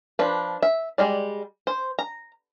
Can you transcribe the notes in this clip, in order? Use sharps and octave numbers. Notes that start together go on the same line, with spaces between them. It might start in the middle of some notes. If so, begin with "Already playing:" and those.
F3 D4 B4
E5
G3 G#3 D5
C5
A#5